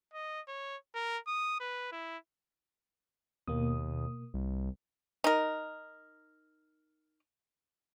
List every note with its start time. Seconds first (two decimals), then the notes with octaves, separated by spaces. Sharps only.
0.14 D#5
0.48 C#5
0.95 A#4
1.27 D#6
1.60 B4
1.92 E4
3.48 D#2 B2 A#3 D#6
4.34 C2
5.24 D#4 A#4